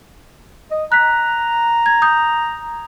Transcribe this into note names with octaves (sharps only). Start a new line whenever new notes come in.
D#5
A#5 F#6 B6
G#6
D#6 G6